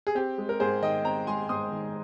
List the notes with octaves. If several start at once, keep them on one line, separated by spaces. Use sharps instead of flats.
G#4
C4 G4
G#3
A#4
G#2 G#4 C5
D#3 D#5 G5
C4 G5 A#5
G#3 G#5 C6
G#2 C6 D#6
D#3